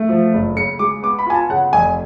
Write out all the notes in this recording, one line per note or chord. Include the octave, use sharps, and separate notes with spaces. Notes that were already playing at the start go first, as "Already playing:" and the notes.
Already playing: A3
F3
F#1
C#3 C#7
G#3 D6
B3 D6
B5
F4 G#5
A5
C#3 F#5
F1 G#5